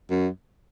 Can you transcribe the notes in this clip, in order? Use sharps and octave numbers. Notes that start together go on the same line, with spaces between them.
F#2